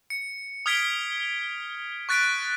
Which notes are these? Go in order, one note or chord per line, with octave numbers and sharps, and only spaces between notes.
C#7
D#6 F6 G#6 B6 D7 G7
C#6 F#6 A6 B6 D7